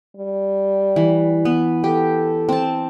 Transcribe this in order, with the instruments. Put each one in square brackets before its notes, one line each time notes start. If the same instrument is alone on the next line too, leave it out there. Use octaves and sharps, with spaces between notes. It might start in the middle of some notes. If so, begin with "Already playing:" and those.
[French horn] G3
[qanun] E3
B3
[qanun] G4 [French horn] A4
[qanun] C4 A5